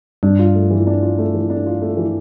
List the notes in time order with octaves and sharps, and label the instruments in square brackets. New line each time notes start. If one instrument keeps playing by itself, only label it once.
[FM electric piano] G2 [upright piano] D4
[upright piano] F4
A3
E3
D4
F4
A3
E3
D4
F4
A3
E3